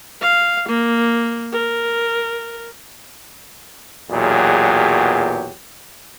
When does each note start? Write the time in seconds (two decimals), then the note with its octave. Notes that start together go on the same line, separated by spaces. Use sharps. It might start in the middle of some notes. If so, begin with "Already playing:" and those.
0.22 F5
0.68 A#3
1.53 A#4
4.10 B1 E2 A#2 F#3 G4 G#4